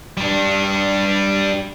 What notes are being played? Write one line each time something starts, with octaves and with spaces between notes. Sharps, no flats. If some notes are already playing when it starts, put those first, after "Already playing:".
G3 D4